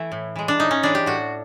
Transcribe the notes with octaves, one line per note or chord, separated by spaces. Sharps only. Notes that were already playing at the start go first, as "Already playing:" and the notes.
Already playing: E3 A3 E4
A2
E3 G#3
D4
A2 D#4
C#4
E3 G#3 D4
G4
A2 F#4